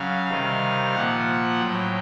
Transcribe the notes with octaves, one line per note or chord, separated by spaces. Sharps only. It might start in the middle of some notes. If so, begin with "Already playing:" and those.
Already playing: C#3 F#3 F5
C3 D#3 G3
A#2 F3 F#5
A2 F#3 G5